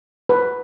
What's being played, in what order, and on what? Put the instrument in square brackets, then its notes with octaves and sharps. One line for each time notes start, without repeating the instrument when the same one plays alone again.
[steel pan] B4